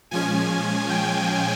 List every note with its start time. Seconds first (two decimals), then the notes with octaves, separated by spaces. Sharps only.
0.11 A#2 F3 G#3 C#4 G#5
0.89 G5